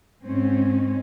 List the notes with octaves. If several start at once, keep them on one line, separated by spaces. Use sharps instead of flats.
G#2 C4 C#4